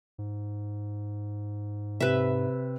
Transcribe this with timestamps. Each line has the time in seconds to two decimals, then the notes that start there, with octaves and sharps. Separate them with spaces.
0.18 G#2
2.00 C3 B4 E5